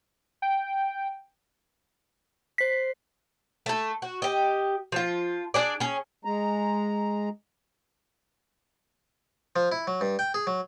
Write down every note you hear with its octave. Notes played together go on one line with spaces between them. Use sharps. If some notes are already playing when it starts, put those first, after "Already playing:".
G5
C5 B6 C7
A3 A4
F#4
G4 D#5
F3 F4
D4 G#4 D5
C#4 G#4
G#3 A#5
F3
E4
F#3
G2
G5
G#4
F#3